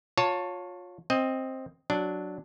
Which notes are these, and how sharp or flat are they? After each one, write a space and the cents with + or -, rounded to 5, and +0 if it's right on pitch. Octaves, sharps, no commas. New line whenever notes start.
F4 +30 C#5 +0 A5 +15
C4 +10 D#5 +10
F#3 +0 D4 +0